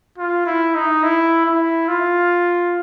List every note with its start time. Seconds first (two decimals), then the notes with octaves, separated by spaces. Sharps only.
0.18 F4
0.46 E4
0.75 D#4
1.03 E4
1.46 E4
1.88 F4